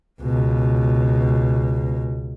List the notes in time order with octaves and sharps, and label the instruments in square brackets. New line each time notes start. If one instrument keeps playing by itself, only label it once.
[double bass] C#2 B2